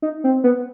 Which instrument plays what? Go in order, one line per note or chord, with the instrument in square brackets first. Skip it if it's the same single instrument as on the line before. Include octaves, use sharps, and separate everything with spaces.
[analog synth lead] D#4
C4
B3